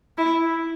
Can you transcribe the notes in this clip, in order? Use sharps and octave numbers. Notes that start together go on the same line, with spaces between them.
E4